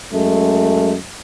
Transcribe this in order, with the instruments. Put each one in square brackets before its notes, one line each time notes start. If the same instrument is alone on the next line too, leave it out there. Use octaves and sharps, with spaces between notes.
[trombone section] F#2 G#3 A3